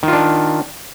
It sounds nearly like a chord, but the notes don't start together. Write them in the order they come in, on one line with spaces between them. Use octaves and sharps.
D#3 F4 D4